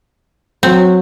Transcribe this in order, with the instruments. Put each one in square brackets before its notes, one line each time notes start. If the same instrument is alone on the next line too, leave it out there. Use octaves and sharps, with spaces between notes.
[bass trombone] F#3 [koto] C4